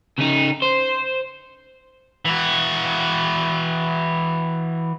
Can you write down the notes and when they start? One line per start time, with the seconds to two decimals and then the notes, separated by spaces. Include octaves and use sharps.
0.19 C#3 D#4
0.62 C5
2.25 E3 F#4